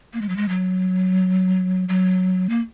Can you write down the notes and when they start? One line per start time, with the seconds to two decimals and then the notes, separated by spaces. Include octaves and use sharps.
0.13 A#3
0.21 G#3
0.29 F#3
0.36 G#3
0.49 F#3
1.89 F#3
2.49 A#3